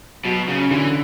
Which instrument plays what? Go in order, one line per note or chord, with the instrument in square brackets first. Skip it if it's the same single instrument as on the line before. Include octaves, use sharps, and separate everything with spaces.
[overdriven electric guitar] B2 [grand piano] F#3
[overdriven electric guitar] C#3 [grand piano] C#4
[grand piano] D3 [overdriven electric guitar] E3